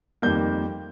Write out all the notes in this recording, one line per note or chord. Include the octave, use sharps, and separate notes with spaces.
F2 D#3 G3 A#3 G6